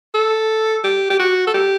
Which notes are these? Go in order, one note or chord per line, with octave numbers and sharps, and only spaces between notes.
A4
G4
G4
F#4
A4
G4